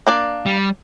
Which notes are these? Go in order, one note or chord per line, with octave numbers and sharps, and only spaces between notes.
A#3 D4 D5
G3